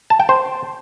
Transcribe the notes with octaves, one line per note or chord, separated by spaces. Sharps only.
A5
G5
C5